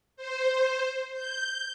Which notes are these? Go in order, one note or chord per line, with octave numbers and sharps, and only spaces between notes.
C5
G6